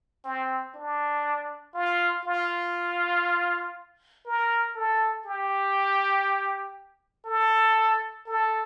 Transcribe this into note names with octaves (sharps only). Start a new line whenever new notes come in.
C4
D4
F4
F4
A#4
A4
G4
A4
A4